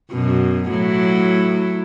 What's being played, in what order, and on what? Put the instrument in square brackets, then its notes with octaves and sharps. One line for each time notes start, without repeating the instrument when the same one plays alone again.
[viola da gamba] F#2 B2
A2 F#3 E4